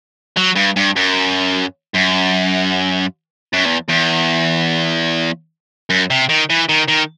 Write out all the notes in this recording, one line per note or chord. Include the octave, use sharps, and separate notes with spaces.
F#3
G2
G2
F#2
F#2
F#2
E2
E2
F#2
C3
D#3
E3
D#3
D#3